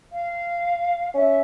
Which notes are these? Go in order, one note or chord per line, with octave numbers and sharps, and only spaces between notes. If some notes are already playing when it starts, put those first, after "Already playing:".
F5
C#4 E5